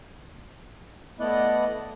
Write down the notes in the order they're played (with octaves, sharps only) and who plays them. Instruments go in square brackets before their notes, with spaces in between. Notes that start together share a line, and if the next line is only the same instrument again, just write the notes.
[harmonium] A3 B3 E4 D5 D#5 F#5